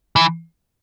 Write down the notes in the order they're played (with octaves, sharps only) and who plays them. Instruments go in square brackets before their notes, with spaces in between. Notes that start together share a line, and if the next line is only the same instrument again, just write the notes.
[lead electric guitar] E3